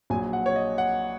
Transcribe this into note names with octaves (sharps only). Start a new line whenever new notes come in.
A#1 A#2 F#3 G#5
F#5
C#5
D#5
F#5